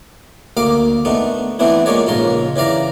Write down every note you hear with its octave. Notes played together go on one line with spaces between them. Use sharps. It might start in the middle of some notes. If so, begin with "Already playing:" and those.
D2 A#3 F5 D6
A3 B3 D4 D#4
E3 A3 B3 C4 D4 E4
G#3 A#3 F4 G#4 C#5 D5
A#1 G#2 C#3 F4 A#4 C6
C#3 E3 D5 F5 A#5